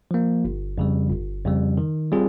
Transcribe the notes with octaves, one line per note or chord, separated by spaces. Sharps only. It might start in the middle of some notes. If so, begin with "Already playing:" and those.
F3 A#3
G1
F2 C#3 G3
G1
F2 C#3 G3
D#3
G3 C4 F4 G#4